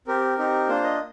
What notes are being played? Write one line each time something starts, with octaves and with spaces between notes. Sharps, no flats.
C4 G4 A#4
C4 D#4 G4
A#3 D4 F4 C5
D#5